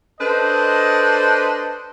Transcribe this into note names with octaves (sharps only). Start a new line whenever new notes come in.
D4 A4 B4 C5 D#5